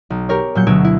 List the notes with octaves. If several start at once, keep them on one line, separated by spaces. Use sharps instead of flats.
B1
G4 A#4 C#5
A#2 F#3 G6 C#7
D2 B2 F#3 E6 G#6 D7
E4